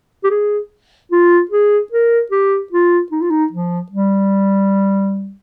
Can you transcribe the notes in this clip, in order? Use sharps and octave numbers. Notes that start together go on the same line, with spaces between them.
G4
G#4
F4
G#4
A#4
G4
F4
D#4
F4
D#4
F3
G3